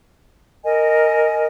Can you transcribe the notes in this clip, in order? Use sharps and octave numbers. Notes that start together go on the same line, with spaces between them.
A#4 D#5 G#5